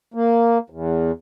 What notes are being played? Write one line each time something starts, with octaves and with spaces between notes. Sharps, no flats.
A#3
E2